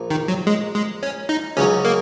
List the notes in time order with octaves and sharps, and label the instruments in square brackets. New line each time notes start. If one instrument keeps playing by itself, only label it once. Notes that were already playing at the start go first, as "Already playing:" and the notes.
Already playing: [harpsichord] A#1 A#2
[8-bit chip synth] D#3
F#3
G#3
G#3
C#4
D#4
[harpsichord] C#2 C#3 F#3 [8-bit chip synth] C#4
[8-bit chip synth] A#3